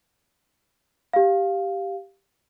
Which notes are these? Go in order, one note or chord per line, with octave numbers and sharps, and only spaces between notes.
G4 F5